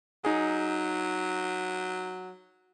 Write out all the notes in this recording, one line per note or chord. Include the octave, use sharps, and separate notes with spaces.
F#3 D#4 G#4